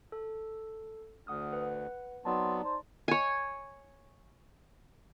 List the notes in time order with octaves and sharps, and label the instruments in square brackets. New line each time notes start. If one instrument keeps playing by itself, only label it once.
[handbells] A4
[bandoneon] D2 [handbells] F#5 D#6 F6
[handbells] B4 F#5
[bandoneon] F#3 B3 [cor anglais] C4 [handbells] D#4 D5 A5
[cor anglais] C5
[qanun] C#5 G#5